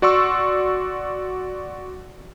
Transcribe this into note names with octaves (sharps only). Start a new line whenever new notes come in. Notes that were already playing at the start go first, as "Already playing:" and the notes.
F#4 D5 C6 C#6 E6